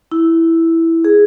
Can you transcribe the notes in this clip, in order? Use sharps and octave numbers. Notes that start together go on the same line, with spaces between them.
E4
G#4